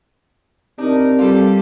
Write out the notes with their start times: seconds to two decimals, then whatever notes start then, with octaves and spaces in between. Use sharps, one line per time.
0.78 C3 D4 D#4 A#4
1.19 G3 F4 G4 A4